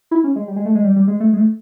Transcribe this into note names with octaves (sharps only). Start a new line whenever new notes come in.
E4
C#4
G#3
G3
G#3
A3
G#3
G3
G3
G#3
A3
G#3
A3